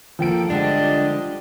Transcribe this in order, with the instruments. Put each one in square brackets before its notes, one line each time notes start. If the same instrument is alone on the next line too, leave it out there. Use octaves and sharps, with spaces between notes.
[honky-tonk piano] F3 G5 D7 [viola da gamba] A#3 A4
[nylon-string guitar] D3 G#3 [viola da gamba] G3 G4 D#5 [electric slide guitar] D4